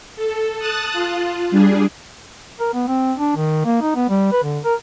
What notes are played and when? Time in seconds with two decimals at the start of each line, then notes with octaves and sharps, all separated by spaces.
0.16 A4
0.58 A5 D#6 F#6 A6
0.93 F4
1.51 G3 D4 G#4
2.60 A#4
2.73 B3
2.87 C4
3.18 D4
3.36 D#3
3.65 A#3
3.81 D#4
3.95 B3
4.09 G3
4.32 B4
4.43 D3
4.64 A#4